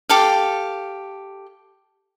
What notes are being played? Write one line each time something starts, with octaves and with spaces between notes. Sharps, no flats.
G4 A4 F5